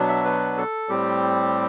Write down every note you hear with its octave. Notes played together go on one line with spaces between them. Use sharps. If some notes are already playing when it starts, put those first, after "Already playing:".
Already playing: B2 F#3 B3 D4
E5
B4
A4
A2 G3 C4 G4